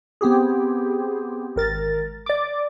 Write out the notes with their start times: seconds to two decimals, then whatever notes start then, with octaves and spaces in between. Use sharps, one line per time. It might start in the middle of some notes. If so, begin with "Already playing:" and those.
0.21 B3 C4 G4 G#4
1.56 G#1 A#4 A6
2.26 D5 D6